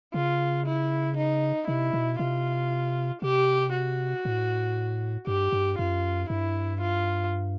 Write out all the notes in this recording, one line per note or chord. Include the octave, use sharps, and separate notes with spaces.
C#3 F4
E4
D#4
C3 E4
B2
C3 F4
C3 G4
F#4
A2
G2 G4
G2
F#2 F4
G2 E4
F4